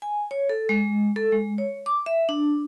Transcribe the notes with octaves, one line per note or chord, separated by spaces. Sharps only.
G#5
C#5
A4
G#3
A4
G#3
C#5
D6
E5
D4